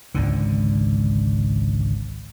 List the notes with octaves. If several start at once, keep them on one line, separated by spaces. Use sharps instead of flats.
G#1 C#2 G#2 D3